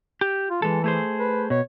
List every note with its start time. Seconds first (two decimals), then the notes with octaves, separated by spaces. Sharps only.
0.21 G4
0.50 F4
0.62 E3 G#3 A4
0.84 A3 G#4 C5
1.19 B4
1.50 B2 C#5